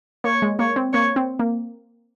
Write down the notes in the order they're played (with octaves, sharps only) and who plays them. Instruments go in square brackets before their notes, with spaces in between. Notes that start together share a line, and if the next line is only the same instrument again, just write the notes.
[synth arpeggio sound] A#3 [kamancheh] C#5
[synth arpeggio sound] G#3
[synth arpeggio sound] A#3 [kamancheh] C#5
[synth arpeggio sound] C4
[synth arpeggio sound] A#3 [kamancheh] C#5
[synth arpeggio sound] C4
A#3